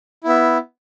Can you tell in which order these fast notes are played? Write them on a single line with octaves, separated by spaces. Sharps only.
E4 B3 E5